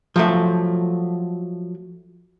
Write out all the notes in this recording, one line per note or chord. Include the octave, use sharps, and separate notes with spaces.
F3 F#3 A3